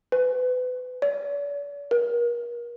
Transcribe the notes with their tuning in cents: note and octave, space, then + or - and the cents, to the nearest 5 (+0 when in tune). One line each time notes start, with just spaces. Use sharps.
B4 +30
D5 -45
A#4 +40